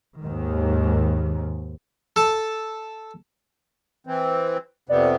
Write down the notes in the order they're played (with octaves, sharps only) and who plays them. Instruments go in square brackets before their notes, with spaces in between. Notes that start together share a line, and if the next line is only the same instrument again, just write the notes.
[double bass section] D#2 G#2 D#3
[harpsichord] A4 A5
[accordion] E3 C4
[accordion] F2 C3 B3 [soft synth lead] D5